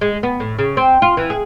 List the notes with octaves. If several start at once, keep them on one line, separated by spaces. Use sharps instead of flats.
G#3
B3
A2
C#3
C4
F4
E3
G#4